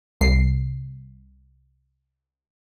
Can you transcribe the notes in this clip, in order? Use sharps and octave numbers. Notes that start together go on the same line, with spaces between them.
C2 C7